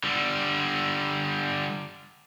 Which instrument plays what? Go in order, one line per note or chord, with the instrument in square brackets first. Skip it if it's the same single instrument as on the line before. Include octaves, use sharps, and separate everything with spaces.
[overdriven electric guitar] D3 G3